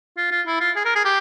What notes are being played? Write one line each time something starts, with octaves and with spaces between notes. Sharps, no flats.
F4
F4
E4
F4
G#4
A#4
G#4
G4